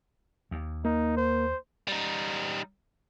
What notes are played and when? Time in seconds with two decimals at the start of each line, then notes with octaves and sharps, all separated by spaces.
0.51 D#2
0.85 A#3 D#4
1.17 C5
1.88 G3 D#4